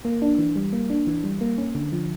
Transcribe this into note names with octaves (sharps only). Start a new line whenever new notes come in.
A#3
D4
E3
G3
A#3
D4
E3
G3
A#3
C#4
D3
F3